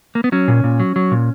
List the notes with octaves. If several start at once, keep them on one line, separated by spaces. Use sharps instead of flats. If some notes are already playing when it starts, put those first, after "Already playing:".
A#3
B3
F#3 C#4
A#2
A#2
F#3
F#3
A#2